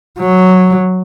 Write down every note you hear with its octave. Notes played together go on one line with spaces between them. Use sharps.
F#3